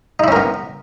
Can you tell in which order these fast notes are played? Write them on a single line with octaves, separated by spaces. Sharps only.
D#4 E4 C#4 A#4 B3